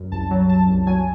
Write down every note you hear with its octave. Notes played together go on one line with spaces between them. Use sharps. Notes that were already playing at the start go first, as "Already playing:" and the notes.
Already playing: F#2
C2 A5
F#3
F#3 A5
C2
F#3 G#5